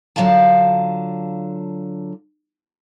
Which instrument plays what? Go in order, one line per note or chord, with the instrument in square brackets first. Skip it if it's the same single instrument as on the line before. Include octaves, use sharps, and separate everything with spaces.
[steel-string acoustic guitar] D3 F#3 F4 F#4 F5 A5